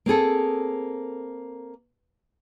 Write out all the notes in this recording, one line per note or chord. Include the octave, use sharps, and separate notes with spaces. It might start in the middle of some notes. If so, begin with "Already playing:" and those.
A#3 C4 G#4 A4